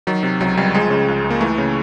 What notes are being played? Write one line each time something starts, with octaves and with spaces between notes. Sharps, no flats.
D#3 F#3
C3
C#2 F#3
C#2 G3
F3 G#3
C#3
C#2
C#2
A#3
E3 A3
C#3